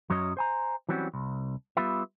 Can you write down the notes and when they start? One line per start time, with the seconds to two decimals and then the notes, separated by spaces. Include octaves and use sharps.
0.10 F#2 F#3 C#4 C#5 D#5
0.37 C5 G#5 A#5
0.89 E3 F#3 G3 C4 C#4 F#4
1.14 C2
1.77 G3 B3 F4 B4 E5